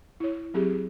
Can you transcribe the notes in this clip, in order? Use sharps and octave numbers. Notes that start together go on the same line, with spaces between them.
E4 C#5
F#3 C4 G4 G#4